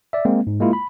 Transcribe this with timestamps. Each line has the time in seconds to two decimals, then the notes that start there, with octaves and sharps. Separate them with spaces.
0.13 D5 E5
0.25 G#3 A#3 C4
0.47 G#2
0.60 G#3 A#3 E4 F4
0.73 B5